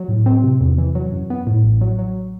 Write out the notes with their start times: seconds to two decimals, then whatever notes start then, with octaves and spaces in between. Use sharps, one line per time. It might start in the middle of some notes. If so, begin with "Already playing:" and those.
Already playing: F#3
0.09 A2
0.26 C4
0.43 C3
0.61 E2
0.78 E3
0.95 F#3
1.12 F#2
1.30 B3
1.47 A2
1.64 A1
1.81 F#3
1.99 F#3